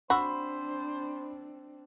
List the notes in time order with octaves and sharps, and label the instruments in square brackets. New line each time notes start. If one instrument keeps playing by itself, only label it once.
[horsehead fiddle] C4 D4 [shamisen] F#4 [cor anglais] C5 [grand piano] B5 C6 E6